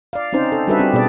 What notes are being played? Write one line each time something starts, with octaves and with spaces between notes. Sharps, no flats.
D5 F5
C4 C#4 D#4 C5
A4
G3 D4 F#4 A4 B4 E5
C4 G4
B2 B3 G#4 D5